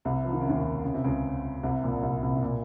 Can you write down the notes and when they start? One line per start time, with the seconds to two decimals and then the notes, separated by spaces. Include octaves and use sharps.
0.05 C2 C3
0.25 F3
0.33 D#3
0.41 C#3
0.49 D#2 D#3
0.84 C#3
0.94 C3
1.04 C#2 C#3
1.63 C2 C3
1.83 A#1 A#2
2.03 C2 C3
2.22 C2 C3
2.36 C3
2.42 A#2